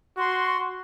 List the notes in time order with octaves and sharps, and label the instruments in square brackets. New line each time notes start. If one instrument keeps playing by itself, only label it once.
[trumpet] F#4 [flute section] C6